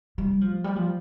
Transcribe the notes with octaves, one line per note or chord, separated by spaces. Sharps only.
G3
F3
G3
F3